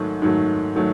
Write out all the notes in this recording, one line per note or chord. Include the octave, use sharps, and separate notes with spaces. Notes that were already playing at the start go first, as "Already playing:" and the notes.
Already playing: G#2 D#3 F#3 A3
G#2 D#3 F#3 A3
D#3 F#3 A3